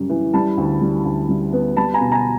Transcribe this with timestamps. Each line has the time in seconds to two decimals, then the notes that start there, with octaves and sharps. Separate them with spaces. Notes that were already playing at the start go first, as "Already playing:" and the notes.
Already playing: F#2 C#3 G3
0.10 E3
0.33 G3 A5 B5
0.57 D2
0.81 G3
1.05 D2
1.29 G3
1.53 B3
1.77 G3 A5 B5
1.94 G#5 A#5
2.01 B2
2.12 G#5 A#5